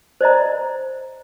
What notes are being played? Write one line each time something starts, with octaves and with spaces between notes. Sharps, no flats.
C5 D5 D#5 A#5